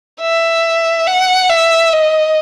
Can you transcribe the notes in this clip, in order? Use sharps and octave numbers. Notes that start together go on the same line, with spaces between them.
E5
F#5
E5
D#5